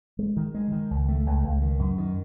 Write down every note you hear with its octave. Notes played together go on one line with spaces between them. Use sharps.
G#3
D#3
G#3
D#3
C#2
A3
C#2
C#2
D#3
F#2
D#3